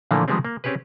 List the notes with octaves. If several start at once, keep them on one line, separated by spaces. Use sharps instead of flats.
A#2 D3 E3 F3 A3 A#3
D#3 F3 G3 G#3 B3 C4
A#3
C4 C#4 G4 G#4 B4